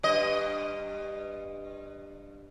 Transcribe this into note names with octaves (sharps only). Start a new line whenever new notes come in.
G2 D#5